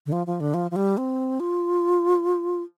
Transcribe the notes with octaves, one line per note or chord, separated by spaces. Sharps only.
D3
F3
F3
D3
F3
F3
G3
C4
F4